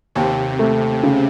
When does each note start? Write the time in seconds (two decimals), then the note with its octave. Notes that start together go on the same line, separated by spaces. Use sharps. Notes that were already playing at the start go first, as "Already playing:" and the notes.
0.15 D#2 C3
0.59 A3
1.03 C#3